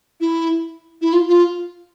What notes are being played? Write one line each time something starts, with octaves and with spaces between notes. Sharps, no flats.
E4
E4
F4
F4